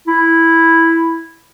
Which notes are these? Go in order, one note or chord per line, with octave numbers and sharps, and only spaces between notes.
E4